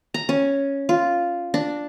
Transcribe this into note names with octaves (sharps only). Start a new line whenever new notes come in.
A#5
C#4
F4
D4